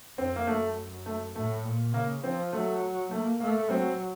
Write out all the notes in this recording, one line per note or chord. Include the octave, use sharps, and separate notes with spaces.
F2 C4
A#3
F#2 A3
A3
A2 A3
A#2
C#3 A#3
F3 C4
F#3 A3
A3 A#3
A3 A#3
F#3 C4